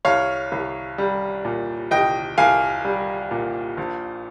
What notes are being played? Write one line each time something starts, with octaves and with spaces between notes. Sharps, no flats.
C2 C#5 F5
C2
G3
A#2
C2 D#5 G5
C2 F5 G#5
G3
A#2
A#1